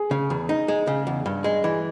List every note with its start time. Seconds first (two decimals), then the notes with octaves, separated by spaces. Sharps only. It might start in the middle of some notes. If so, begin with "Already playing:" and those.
Already playing: G#4
0.11 C#3
0.30 E2
0.49 D#4
0.68 G#3
0.87 C#3
1.07 E2
1.26 G2
1.44 G#3
1.64 E3